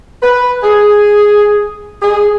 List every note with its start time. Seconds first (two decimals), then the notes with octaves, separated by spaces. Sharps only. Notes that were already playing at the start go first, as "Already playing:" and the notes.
0.22 B4
0.63 G#4
2.02 G#4